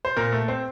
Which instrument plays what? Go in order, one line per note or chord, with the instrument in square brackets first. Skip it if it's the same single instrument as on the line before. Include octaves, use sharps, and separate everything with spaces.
[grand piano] C5
A#2 A#4
A3
C4